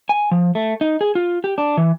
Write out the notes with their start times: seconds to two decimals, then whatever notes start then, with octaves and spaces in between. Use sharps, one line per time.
0.09 G#5
0.31 F3
0.55 A3
0.81 D#4
1.01 G#4
1.15 F4
1.44 G4
1.58 D4
1.77 E3